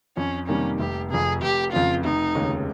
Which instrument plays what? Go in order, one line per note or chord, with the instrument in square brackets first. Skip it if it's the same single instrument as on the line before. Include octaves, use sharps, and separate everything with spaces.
[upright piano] F2 [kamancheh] C#4
[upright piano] C3 D#3 G3 A#3 [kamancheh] C#4
[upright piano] F1 [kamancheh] G4
[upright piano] F2 C3 [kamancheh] G#4
[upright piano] F1 [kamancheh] G4
[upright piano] F2 C#3 [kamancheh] F4
[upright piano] F1 [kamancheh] D#4
[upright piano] D#2 C#3 G#3 C#4